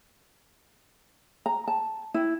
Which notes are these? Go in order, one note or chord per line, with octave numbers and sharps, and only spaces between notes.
A#5
A5
E4